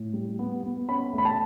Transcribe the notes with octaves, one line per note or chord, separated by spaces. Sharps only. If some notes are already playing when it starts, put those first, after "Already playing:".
Already playing: A2
G3
B3
B3
C#4 B5
A3 B5
A5